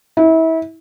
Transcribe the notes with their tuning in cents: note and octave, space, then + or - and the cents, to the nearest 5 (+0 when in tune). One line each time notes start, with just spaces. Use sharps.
E4 -30